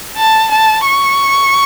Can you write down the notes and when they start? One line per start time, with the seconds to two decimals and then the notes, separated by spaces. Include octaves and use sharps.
0.17 A5
0.51 A5
0.87 C#6